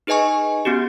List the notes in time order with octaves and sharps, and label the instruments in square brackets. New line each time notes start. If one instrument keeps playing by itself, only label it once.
[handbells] D#4 G#4 B4 D#5 G#5 C#6
B3 C#4 F#4 G4